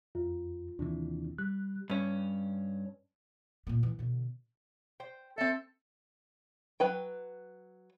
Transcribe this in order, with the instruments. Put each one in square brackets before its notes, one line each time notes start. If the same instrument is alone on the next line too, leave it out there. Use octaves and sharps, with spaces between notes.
[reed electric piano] F2 [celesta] F4
[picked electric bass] D#2 C3 E3 [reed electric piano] D4
[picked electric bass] G3 [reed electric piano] F#6
[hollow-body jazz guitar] G2 C#4
[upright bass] A#2 A#3
E3
B2 D3
[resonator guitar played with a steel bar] C5 G5
[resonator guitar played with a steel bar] C4 E5 [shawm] A4
[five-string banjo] F#3 B4 G5